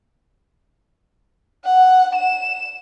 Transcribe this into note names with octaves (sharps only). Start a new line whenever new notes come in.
F#5
E7